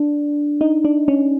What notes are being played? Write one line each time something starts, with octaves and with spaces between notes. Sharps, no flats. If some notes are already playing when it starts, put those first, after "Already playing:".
Already playing: D4
D#4
D4
C#4